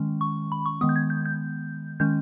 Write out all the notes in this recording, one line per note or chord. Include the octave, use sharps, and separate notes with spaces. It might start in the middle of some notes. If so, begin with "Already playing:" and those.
Already playing: D#3 G#3 C#4
C#6
B5
C#6
D#3 G#3 B3 D#6
G6
G#6
G6
G6
D#3 G#3 C#4 G6